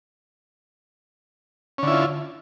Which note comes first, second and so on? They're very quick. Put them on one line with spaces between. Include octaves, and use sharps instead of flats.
C#4 D3 E4 F4